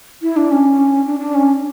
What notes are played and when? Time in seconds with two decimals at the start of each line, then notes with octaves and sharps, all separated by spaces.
0.22 E4
0.36 D4
0.51 C#4
1.06 D4
1.20 D4
1.35 C#4